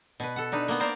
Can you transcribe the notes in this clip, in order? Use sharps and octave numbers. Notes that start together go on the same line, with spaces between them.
B2 B4
A4 F#5
D4 D#4 B4
A#3 B3
A#4 C5 D5